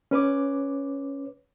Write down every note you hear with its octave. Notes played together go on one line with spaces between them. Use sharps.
C#4 B4 C#5 D6